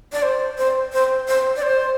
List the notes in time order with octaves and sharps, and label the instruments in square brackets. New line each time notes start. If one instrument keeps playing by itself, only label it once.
[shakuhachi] D5
C5
C5
C5
C5
D5
C5